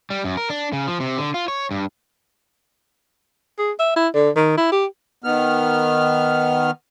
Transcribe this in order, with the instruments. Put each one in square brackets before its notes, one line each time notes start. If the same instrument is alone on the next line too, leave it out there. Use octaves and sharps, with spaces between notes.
[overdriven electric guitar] G3
F#2
A#4
D4
C#3
F3
C3
D3
F4
C#5
G2
[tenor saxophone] G#4
E5
E4
D3
D#3
E4
G4
[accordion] D#3 B3 F6